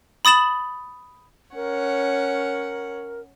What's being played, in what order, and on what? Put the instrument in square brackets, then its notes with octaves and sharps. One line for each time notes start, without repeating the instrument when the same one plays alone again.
[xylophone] B5 D#6 A6 E7 F#7
[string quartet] C#4 C#5 F#5 [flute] A#4